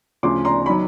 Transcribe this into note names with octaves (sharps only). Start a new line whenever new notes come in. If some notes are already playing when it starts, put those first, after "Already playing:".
D2 C#3 F3 C6 D6
A#5 C6
D#3 F#3 B5